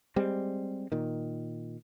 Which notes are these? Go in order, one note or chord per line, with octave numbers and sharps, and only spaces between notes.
G3 G#3 C4
A#2 D#3